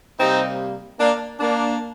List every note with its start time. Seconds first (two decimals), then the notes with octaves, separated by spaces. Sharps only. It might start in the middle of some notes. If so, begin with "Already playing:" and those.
0.18 C3 G3 A#3 C4 D#4
0.99 A#3 D4
1.40 A#3 D4